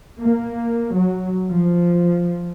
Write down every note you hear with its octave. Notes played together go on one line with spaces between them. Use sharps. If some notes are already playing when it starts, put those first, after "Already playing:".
A#3
F#3
F3